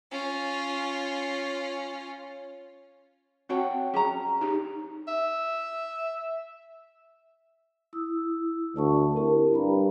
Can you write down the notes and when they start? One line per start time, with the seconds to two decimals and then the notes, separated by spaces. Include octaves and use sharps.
0.11 C#4 F4
3.49 C4 F#4 C#5 F#5 G5 A5
3.94 C#4 G#4 A#5
4.41 D#4 G4
5.08 E5
7.93 E4 D#6 E6
8.76 D2 D5 A5 C#6
9.16 C4 E4 G4 A#4
9.54 G2 A#5 B5